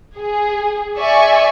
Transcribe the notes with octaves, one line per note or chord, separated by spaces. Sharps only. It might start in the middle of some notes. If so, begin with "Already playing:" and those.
G#4
D5 E5 G#5 C#6